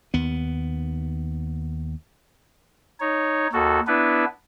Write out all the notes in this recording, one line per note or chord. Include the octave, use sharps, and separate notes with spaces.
D#2 B3
D#4 C#5
D#2 F#4 A4
B3 D4 E4 B4